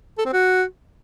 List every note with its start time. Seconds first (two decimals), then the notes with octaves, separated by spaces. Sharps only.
0.19 A4
0.26 C4
0.33 F#4